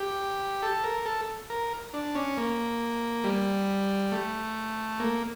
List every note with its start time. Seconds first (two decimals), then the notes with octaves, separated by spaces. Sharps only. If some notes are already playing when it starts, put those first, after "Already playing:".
Already playing: G4
0.62 A4
0.84 A#4
1.06 A4
1.50 A#4
1.94 D4
2.15 C#4
2.38 A#3
3.24 G3
4.12 A3
5.00 A#3